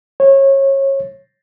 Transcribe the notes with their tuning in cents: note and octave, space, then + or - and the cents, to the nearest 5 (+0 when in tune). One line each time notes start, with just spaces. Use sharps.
C#5 -25